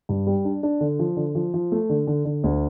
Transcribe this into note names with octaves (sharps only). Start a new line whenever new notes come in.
G2
G3
D4
D4
D3
F3
D3
F3
F3
A3
D3
D3
D3
D2